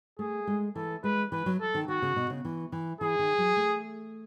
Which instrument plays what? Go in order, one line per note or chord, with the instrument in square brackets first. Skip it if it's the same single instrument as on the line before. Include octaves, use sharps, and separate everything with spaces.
[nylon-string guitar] A3 [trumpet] G#4
[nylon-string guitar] G#3
[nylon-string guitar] E3 [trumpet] A4
[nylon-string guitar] G#3 [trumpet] B4
[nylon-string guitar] E3 [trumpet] B4
[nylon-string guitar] F#3
[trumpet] A4
[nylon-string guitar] D#3
[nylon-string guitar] D#3 [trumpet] F#4
[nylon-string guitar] C#3
B2
C#3
E3
E3
[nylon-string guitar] E3 [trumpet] G#4
[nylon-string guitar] D#3
F#3
A3